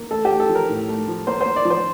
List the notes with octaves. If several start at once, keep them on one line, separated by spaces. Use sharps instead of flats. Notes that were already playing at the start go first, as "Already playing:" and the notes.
Already playing: A#3
A3 A4
G4
A3
A4
F3
A#4
A2
A3
F3
A#3 C5
A#3 C5
D5
F3
C5